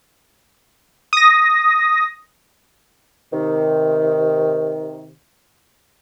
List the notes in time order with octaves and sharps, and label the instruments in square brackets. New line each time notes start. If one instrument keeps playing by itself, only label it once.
[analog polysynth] D#6 A#6
[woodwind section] C3 D#3